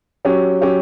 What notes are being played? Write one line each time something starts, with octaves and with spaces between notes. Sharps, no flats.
F#3 C#4 G4
F#3 C#4 G4